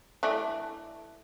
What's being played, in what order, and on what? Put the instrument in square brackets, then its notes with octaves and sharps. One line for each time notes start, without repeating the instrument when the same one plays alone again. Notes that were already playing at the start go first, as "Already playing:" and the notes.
[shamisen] E3 A3 D4